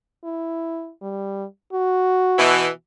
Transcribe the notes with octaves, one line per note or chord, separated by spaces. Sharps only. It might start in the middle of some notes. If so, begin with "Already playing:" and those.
E4
G3
F#4
B2 E3